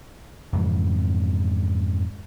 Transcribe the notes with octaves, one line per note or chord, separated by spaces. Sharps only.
F2 G#2 C#3 E3